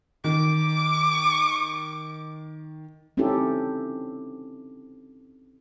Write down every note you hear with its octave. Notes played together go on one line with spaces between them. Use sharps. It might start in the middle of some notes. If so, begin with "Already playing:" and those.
D#3 D6
C4 C#4 D#4 E4 G4 A4